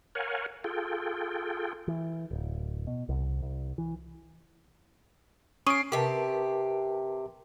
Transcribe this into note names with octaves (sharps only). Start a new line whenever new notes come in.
A#4 C#5 F5 F#5 G#5
F4 G#4 A4 G5
E3
D1
B2
C2
C2
E3
C#4 C#6 D#6 C7 D7 D#7
C3 G4 A#4 B4 A5